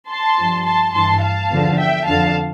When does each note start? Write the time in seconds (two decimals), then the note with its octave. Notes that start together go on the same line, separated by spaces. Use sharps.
0.10 A5 C6
0.38 G2 F3
0.65 A5 C6
0.93 G2 E3 A5 C6
1.22 F5 A5
1.50 E2 D3 F3
1.78 E5 G5
2.06 F2 D3 F3 F5 A5